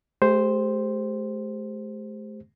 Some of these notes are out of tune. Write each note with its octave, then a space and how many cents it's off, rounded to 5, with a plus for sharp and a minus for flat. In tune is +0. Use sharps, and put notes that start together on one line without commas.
A3 -40 G4 +10 C5 +0